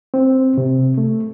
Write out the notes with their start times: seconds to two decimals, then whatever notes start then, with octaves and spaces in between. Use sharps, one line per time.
0.14 C4
0.58 C3
0.98 A3